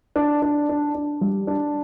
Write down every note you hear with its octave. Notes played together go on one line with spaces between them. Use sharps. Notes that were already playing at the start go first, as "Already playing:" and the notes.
D4
D4
D4
D4
G3
D4